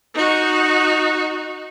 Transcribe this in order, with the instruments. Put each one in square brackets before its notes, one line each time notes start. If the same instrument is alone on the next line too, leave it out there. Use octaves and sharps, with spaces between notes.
[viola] D#4 F#4